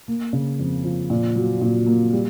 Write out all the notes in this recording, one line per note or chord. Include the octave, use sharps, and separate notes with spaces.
A#3
C#3
F2
F3
A#2
F#3
A#2
A#3
G3